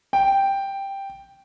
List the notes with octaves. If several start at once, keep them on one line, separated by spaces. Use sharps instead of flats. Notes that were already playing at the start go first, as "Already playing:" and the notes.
G5